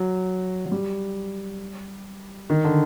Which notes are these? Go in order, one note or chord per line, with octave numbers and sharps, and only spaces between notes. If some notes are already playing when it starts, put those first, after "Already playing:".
Already playing: F#3
F#3
G3
D#3
D3